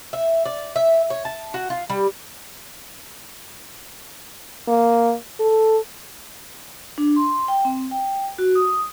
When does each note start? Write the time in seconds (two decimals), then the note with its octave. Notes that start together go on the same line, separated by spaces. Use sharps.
0.13 E5
0.46 D5
0.76 E5
1.10 C#5
1.25 A5
1.54 F#4
1.70 F4
1.90 G3
4.68 A#3
5.40 A4
6.98 D4
7.16 C6
7.48 G5
7.65 C4
7.91 G5
8.38 F#4
8.55 D#6